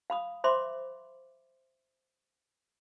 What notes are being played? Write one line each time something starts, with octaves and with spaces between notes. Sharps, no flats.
F5 B5 D#6
C5 E5 B5 C6 D6